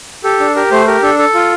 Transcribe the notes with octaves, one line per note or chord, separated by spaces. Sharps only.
G4 A4
D4
G4 A#4
A3 C5
G4 A#4
D4 A4
A4
F4